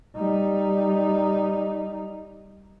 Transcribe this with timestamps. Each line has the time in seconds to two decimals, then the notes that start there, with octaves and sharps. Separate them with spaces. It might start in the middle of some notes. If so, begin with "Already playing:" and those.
0.16 G3 D#4